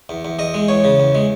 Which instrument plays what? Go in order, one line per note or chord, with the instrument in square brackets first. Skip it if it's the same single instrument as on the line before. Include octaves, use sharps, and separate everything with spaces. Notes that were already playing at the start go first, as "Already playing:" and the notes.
[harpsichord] E2
E2
E2 D#5
G#3
E2 C#5
C#3
E2
G#3